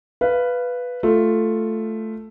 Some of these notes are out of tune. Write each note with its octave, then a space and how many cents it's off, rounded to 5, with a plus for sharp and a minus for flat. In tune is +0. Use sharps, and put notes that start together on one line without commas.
B4 +0 F5 -10
A3 +0 F4 +0